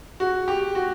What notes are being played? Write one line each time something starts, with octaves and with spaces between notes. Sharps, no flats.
F#4
G4
F#4